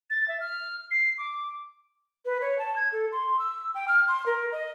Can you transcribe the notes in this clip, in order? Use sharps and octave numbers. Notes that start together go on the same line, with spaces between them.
A6
E5
F6
C7
D6
B4
C#5
A5
G#6
A4
C6
E6
G5
F6
C6
A#4
D#5